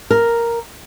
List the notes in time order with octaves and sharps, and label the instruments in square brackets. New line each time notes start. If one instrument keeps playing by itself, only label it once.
[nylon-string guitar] A#4